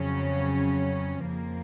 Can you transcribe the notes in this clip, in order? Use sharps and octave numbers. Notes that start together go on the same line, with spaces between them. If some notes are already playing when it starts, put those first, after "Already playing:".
Already playing: F2 C#3 F#3 C#4
F2 F3 A#3